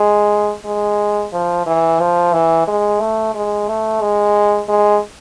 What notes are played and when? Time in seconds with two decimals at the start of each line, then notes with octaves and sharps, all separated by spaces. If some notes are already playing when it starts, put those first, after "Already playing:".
Already playing: G#3
0.65 G#3
1.33 F3
1.67 E3
2.00 F3
2.33 E3
2.67 G#3
3.01 A3
3.35 G#3
3.68 A3
4.01 G#3
4.68 G#3